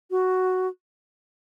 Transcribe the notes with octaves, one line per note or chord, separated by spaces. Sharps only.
F#4